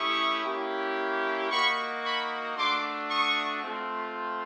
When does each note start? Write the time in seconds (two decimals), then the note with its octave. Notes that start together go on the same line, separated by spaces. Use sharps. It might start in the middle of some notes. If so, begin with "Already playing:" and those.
Already playing: A3 C#4 E4 G4 C#6 D#6
0.46 A#3 C#4 E4 G4
1.51 A#3 D#4 F#4 B5 C#6
2.04 B5 C#6
2.57 A3 D4 F#4 C6 D6
3.10 C#6 D#6
3.63 A3 C4 F4